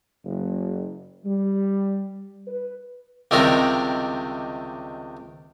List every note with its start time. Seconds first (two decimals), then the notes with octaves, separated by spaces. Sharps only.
0.24 F#1
1.25 G3
2.48 B4
3.31 C#2 C3 D#3 G3 E4 A#4